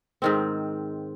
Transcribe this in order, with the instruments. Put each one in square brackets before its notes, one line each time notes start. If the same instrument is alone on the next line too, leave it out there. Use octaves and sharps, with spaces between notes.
[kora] G#2 D#3 C4